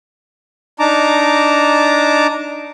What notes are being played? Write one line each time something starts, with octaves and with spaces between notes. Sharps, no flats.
D4 D#4 A5 A#5 D6